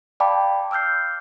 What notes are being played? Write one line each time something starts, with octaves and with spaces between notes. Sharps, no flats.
D5 F5 G5 A5 B5 D6
D6 E6 F6 G6 C7